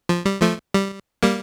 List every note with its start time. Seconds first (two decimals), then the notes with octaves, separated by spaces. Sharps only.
0.09 F3
0.25 G3
0.42 F3 A3
0.74 G3
1.23 G3 A#3